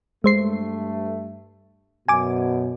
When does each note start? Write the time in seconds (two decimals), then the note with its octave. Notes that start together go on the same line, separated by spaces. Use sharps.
0.24 G2 G#3 A3 C5 C7
2.08 F#2 B2 G#5 D6